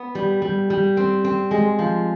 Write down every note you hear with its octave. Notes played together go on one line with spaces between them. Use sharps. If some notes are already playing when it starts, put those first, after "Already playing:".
Already playing: B3
G3
G3
G3
C4
C4
G#3
F3